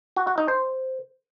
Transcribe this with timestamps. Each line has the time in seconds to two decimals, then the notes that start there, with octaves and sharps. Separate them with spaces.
0.16 F#4
0.27 F#4
0.38 D#4
0.48 C5